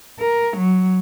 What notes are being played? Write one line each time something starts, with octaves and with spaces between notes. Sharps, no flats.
A#4
F#3